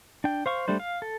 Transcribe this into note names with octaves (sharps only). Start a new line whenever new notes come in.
D4 G5
C5 F5 C#6
G3 A3 D4 C5
F5
A4